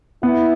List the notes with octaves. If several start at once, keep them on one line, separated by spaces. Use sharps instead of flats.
B3 E4